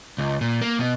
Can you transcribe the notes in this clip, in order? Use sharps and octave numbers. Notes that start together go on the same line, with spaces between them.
C#2
A#2
A#3
B2